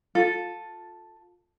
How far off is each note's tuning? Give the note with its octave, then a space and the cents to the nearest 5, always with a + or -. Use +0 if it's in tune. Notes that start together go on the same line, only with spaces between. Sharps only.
F4 +20 A4 +0